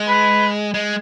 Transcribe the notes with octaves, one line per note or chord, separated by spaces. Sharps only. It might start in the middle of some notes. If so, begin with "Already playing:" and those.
Already playing: G#3
B4
G#3